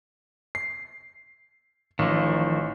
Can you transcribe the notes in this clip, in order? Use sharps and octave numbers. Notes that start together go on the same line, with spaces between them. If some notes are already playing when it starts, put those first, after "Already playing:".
C7
A1 D#3 F3